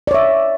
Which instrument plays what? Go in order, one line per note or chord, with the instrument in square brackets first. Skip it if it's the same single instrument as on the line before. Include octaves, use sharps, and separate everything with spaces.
[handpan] D5
C#5
E5